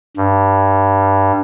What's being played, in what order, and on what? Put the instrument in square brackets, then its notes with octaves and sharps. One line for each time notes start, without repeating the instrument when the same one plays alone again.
[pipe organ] G2